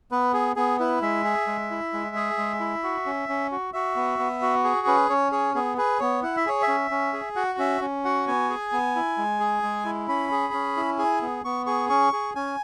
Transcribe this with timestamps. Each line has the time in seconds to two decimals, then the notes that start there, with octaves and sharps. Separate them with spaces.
0.11 B3 B4
0.34 G#4
0.56 B3 G#4
0.79 E4 B4
1.02 G#3 E5
1.24 G#4
1.47 G#3
1.71 E4
1.93 G#3
2.16 G#4
2.38 G#3
2.60 E4
2.84 F#4
3.06 C#4
3.29 C#4
3.52 F#4
3.73 F#4 E5
3.96 B3
4.19 B3
4.42 F#4
4.64 G#4
4.87 C#4 B4
5.10 C#4 C#5
5.32 G#4 C#5
5.55 B3 G#4
5.78 G#4 B4
6.00 B3 C#5
6.23 E4 F#5
6.37 E5
6.46 G#4 C#5
6.62 E5
6.68 C#4
6.91 C#4
7.13 G#4
7.36 F#4 F#5
7.59 C#4 E5
7.81 C#4
8.05 F#4 F#5
8.27 B3 G#5
8.50 G#4
8.72 B3
8.96 E4
9.18 G#3
9.40 G#4
9.63 G#3
9.85 E4
10.08 C#4 B5
10.31 G#4
10.53 C#4
10.77 E4
10.99 G#4 G#5
11.22 B3
11.45 B3 C#6
11.66 G#4 C#6
11.89 C#4 C#6
12.13 G#4
12.35 C#4 G#5